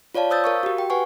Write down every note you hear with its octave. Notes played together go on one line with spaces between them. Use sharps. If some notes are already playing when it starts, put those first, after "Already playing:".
F4 C#5 D5 F5 A5
C5 D#6 E6 G6 A6
A#4 F5 C#6
F#4 G4
G5
B4 F#5 G#5 C#6